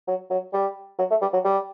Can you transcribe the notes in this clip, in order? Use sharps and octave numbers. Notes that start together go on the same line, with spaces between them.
F#3
F#3
G3
F#3
A3
G3
F#3
G3